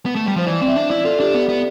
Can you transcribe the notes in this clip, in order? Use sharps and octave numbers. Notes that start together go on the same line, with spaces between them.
B3
A3
G3
F3 C5
E3 D5
C4 D5
E5
D4
E4 D5
F4 A4
D4 G4
B3
B3